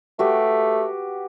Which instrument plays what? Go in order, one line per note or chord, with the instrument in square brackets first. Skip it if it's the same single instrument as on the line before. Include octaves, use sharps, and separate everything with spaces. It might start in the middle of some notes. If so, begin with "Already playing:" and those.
[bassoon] A3 [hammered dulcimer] F#4 G4 B4